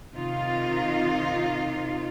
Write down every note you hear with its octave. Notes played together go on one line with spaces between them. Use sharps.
C3 D#3 D#4 F4